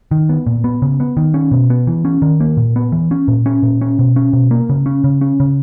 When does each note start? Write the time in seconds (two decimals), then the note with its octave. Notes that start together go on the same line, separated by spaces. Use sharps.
0.11 D#3
0.29 B3
0.46 A#2
0.64 B3
0.82 C#3
1.00 B3
1.17 D#3
1.34 C#4
1.52 B2
1.70 B3
1.87 E3
2.05 C#4
2.22 D#3
2.40 A#3
2.57 A#2
2.76 B3
2.92 E3
3.11 C#4
3.28 A#2
3.46 C#4
3.63 A#2
3.81 C#4
3.99 B2
4.16 C#4
4.33 B2
4.51 A#3
4.69 C#3
4.86 C#4
5.04 C#3
5.21 C#4
5.40 C#3